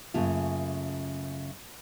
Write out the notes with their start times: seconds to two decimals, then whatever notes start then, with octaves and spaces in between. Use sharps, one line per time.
0.14 F#2 C#3 A3 A#3 F4